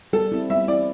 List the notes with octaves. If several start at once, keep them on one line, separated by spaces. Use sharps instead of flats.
G3 A4
C4 E4
G3 E5
C4 E4 D5